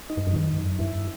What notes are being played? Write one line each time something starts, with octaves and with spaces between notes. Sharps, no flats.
D#4
G2
F#2
G2 D#3
F#2
G2 E4